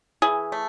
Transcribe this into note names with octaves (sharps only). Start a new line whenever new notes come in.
E3 G#4
A3